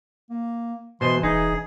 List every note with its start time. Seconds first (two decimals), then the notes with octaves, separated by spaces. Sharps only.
0.30 A#3
1.01 B2 E3 C5 D#5 C6
1.23 E1 D#4 G#4